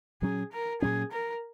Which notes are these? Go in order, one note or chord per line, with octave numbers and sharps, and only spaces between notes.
A#2 F#3 C#4 G#4
A#4
A#2 F#3 C#4 G#4
A#4